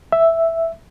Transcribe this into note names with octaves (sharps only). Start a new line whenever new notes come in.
E5